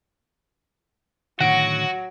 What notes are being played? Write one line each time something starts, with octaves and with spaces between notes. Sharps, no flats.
A2 D3 D#3 F#3 F#4 F#5 A#6 D7